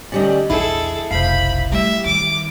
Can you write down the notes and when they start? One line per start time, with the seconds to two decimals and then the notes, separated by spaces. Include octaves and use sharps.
0.12 D2 G3 C#4 D5 D#5
0.50 A#1 E2 E4 G#4 A4
1.11 F1 B1 C5 F5 B5
1.72 G3 A3 E5
2.05 D#3 D6